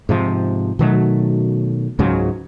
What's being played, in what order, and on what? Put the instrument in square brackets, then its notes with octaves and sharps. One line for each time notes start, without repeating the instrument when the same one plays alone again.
[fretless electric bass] G#2 C3 F3
B2 D#3 F#3 A3
C#2 G#2 C#3 F#3